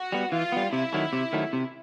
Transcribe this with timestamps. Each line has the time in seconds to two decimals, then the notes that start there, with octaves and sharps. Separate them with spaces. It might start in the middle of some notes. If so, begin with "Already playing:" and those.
Already playing: F#4
0.12 G3 B3
0.32 E3 F4
0.52 G3 B3
0.73 C3 E4
0.93 D#3 F#3 A3
1.13 C3
1.33 D#3 F#3 A3
1.53 C3